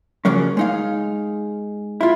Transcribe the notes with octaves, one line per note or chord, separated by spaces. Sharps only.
C#3 F3 F#3 A#3 C#4
G#3 D#4 F5
E4 F4